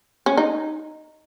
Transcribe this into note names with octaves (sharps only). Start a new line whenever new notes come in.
C#4
D#4